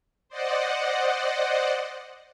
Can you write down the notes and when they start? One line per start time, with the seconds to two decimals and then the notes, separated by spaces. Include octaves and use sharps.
0.29 C5 D5 D#5 F#5